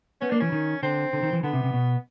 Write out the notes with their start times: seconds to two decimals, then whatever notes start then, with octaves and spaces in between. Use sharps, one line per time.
0.21 B3 C#4
0.30 A#3 D4
0.40 E3 C#4
0.52 D#3
0.83 D3 C4
1.13 D3
1.23 D#3
1.33 E3
1.43 D3 B3
1.53 C3
1.64 C3
1.74 B2